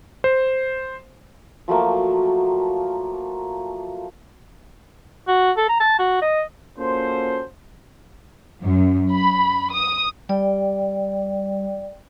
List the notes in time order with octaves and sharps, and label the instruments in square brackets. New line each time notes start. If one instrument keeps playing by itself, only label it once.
[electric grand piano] C5
[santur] F3 F#3 A3 A#3
[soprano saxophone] F#4
A4
A#5
A5
F#4
D#5
[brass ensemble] A#3 C#4 F4 F#4 A4 C5
[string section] F#2
B5
D#6
[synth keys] G3 [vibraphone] D5 G5